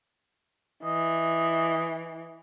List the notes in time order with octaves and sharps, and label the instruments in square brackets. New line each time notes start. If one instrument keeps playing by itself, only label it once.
[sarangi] E3 [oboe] D#5